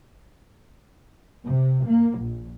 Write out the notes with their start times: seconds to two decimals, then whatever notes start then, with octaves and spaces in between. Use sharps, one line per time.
1.44 C3
1.87 A#3
2.19 A#1